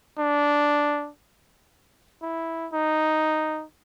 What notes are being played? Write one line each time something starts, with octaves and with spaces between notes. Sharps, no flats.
D4
E4
D#4